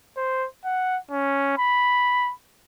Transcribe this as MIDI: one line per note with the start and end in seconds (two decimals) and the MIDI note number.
0.17 0.47 72
0.65 0.98 78
1.11 1.54 61
1.58 2.32 83